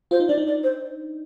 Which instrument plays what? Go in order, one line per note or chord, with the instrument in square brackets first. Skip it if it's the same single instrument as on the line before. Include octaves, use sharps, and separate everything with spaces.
[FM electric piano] F4 [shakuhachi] C5
[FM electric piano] D#4
[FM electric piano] D4 [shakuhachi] D5
[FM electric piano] D#4
[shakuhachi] D5
C5